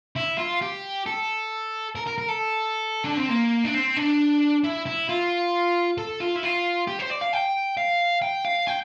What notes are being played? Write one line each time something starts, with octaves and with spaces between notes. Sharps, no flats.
E4
F4
G4
A4
A#4
A#4
A#4
A4
D4
C4
A#3
D4
C4
D4
E4
E4
F4
A4
F4
E4
F4
G4
C5
D5
F5
G5
F5
G5
F5
G5